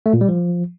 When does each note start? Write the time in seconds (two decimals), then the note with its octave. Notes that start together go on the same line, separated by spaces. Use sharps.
0.06 A3
0.13 A#2
0.21 G3
0.29 F3